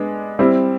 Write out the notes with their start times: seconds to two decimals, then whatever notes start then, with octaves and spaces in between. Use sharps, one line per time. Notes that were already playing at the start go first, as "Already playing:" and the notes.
Already playing: G#3 B3 D4
0.39 G3 C4 E4